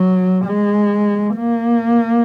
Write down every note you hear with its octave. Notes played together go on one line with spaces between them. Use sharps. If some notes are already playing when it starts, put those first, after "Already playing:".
Already playing: F#3
G#3
A#3